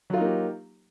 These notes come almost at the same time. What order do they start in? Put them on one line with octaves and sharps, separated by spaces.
F#3 F4 D#4 A#3 G4